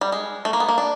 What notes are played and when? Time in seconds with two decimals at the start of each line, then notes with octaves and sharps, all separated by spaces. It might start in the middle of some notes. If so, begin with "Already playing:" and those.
0.01 G3
0.12 G#3
0.45 A3
0.53 A#3
0.60 B3
0.69 A#3
0.78 D4